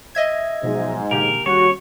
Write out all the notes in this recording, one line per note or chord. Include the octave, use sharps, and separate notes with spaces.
D#5 E5 G#6
G#2 B2 F3 F#3
A#2 D3 E3 A#3 G4 G#4 A#4
D#2 G3 C#4 F#4 C#5